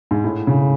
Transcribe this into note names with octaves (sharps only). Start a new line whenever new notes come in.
G#2
A2
C#3